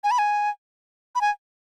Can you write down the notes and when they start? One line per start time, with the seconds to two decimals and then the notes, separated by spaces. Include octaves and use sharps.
0.04 G#5
0.11 B5
0.18 G#5
1.15 B5
1.21 G#5